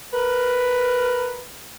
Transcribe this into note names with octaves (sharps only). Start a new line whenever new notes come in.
A#4 B4